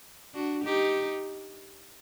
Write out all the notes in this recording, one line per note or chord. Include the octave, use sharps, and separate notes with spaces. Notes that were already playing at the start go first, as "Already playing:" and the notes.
D4 F#4
D#4 G4